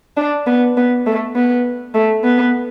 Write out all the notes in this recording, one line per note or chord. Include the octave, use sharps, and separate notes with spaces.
D4
B3
B3
A3
B3
A3
B3